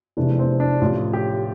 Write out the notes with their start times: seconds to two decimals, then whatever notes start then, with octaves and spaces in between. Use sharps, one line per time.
0.17 F1 E2 C3 E3 A3 D4
0.39 C4
0.60 D4
0.81 A1 A2 F3 A3 F4
1.13 G4